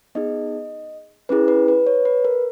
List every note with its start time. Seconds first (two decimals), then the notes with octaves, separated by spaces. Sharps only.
0.15 B3 D#4 G#4 D#5
1.29 C#4 E4 G#4 B4
1.48 B4
1.68 B4
1.86 C#5
2.05 B4
2.25 A#4